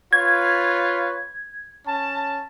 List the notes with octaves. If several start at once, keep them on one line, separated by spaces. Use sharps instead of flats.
F4 B4 C#5 G#6
C#4 A5